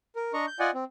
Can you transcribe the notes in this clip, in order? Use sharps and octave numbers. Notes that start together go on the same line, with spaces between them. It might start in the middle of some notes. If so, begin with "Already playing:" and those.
A#4
D4 D#5 A#5 C#6
G6
F4 D5 D#5 F#5 G#5
C4